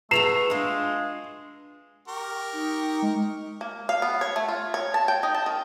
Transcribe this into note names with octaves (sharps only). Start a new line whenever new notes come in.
A3 F#4 G#4 B4 C7 E7 F7
G#3 D4 F4
G4 A#4 C#6
D#4
G#3
A#3
F5
B3
C#5
A3
F4
C#5
A5
G5
D#4
A5
D#3